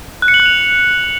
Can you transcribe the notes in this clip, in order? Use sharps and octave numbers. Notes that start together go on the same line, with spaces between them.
F#6
C#7
F#7
F#6
F7